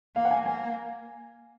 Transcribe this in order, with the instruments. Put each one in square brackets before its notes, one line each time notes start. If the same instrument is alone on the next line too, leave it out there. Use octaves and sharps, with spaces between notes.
[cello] A#3 [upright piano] F5
[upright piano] F#5
G#5
[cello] A#3 [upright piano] G#5